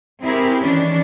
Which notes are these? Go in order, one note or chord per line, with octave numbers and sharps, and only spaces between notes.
C4 E4 G4 G#4 A#4
D#3 E3 C#4 D4